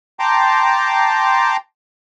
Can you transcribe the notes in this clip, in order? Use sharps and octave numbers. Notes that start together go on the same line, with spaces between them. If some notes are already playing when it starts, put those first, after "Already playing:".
G5 A5 A#5 C6 D6